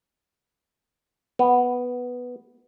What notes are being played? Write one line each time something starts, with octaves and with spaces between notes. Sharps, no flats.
B3